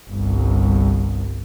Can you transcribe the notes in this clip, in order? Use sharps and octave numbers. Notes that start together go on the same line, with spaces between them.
G1 C2